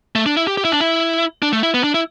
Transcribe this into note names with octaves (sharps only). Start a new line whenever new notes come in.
A3
D4
E4
G4
G4
E4
D4
E4
D4
A3
E4
B3
D4
E4